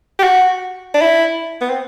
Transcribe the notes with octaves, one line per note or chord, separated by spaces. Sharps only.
G4
F#4
D4
E4
B3
C4